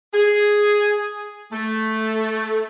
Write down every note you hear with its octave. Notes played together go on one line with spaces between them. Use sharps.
G#4
A3